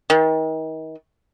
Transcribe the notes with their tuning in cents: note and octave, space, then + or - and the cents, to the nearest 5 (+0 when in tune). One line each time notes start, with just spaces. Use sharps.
D#3 +35